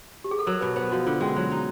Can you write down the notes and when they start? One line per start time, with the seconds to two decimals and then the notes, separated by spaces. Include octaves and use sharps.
0.24 G4
0.31 G#4
0.39 A4
0.47 F#3 A#4
0.61 B2 B4
0.76 B3 C5
0.91 F3 F#4
1.06 D3 F4
1.20 G#3 C#4
1.36 F#3
1.51 D#4